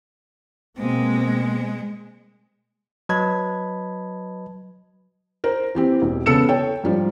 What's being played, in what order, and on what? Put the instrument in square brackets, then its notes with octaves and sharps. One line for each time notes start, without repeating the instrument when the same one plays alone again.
[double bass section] B2 A#3 C4 [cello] G#3
[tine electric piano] F#3 B4 D#5 A5 B5 G#6
[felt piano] A#4 C5
E3 C4 G4
E1
C#3 B3 A4 E6 C#7 E7
A4 C#5 G5
G#2 F3 G3